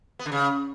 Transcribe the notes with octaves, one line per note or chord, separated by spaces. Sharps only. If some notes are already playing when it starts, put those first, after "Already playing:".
B3
D3
C#3